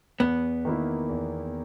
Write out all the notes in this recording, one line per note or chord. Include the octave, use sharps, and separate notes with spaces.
E2 B3
D#3 A#3 E4
E2